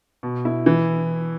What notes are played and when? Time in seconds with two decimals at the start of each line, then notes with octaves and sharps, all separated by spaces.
0.23 B2
0.45 E4
0.66 E3